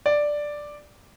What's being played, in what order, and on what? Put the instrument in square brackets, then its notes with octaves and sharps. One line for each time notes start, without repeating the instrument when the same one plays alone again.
[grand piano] D5